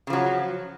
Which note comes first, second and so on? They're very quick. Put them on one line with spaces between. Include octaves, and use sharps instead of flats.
C#3 F3 F#3